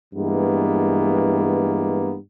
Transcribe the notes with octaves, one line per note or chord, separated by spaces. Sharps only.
G2 E3 G#3 A#3 B3